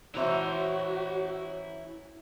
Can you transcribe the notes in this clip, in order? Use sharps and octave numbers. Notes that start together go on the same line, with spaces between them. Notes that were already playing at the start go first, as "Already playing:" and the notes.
E3 E4 F#4 C5 C#5 E5 A#5